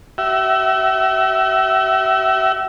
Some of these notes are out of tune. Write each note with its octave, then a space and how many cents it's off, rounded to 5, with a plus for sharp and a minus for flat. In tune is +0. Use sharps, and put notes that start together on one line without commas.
F#4 +45 E5 +0